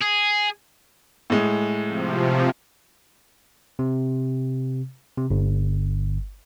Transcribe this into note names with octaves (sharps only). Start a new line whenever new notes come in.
G#4
A2 G#3
C3 F3
C3
C3
G1